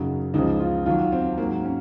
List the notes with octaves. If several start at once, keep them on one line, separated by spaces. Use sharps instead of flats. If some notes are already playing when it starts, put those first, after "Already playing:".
Already playing: F#2 C#3 F#3 D#4
C#2 C#3 F3 D#4
F4
D#2 D#3 F#3 F4
C4
G#2 F#3 A#3
C#4